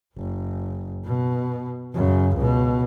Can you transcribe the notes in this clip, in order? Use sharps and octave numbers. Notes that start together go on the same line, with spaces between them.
F#1
B2
F#2 C#3
C#2 B2